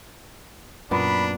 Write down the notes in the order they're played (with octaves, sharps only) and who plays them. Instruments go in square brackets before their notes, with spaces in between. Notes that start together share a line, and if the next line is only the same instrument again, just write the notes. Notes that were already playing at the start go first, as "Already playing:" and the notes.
[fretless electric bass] F#2 [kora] A#2 B3 [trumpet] D4 [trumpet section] B5